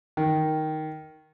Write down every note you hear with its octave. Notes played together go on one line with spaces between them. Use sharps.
D#3